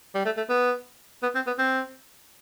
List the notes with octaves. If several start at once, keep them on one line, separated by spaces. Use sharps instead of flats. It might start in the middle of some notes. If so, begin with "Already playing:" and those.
G3
A3
A3
B3
B3
C4
B3
C4